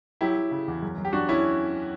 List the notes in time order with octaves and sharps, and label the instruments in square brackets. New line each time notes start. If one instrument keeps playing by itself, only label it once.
[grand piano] F#3 E4 G4
F#3
C#3
E2
F#2
F#2
G4
F#2 D4 F#4
C#4 E4